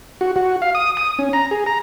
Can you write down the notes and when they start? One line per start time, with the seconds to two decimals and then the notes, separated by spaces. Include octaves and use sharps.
0.21 F#4
0.36 F#4
0.62 F5
0.75 D#6
0.97 D#6
1.19 C#4
1.33 A#5
1.51 G#4
1.66 A#5